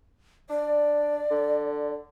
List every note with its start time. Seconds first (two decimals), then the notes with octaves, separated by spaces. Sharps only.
0.50 D4 D5
1.30 D3